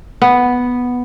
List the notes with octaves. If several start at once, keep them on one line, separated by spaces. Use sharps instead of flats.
B3